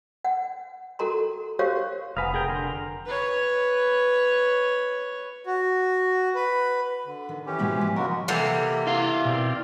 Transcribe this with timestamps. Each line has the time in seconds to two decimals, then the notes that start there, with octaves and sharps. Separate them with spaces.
0.25 F#5
0.99 F#4 A4 A#4 A#5 C6
1.59 F#4 G4 A#4 C5 C#5 F5
2.17 F1 B4 F5 F#5 G#5 A#5 D#6
2.34 G#4 A#4 G5
2.49 D3 A#4 C6
3.06 B4 C#5
5.46 F#4
6.35 B4
7.05 D3
7.29 D#3
7.46 E3 C#4 G4
7.59 G#2 B2 G#3
7.81 F3
7.96 C#3 G#3 F#4 A#4
8.28 C3 E3 G3 A#3 A4 A#4 F#5
8.87 E4 F5
9.25 B2 C4 A#4 D5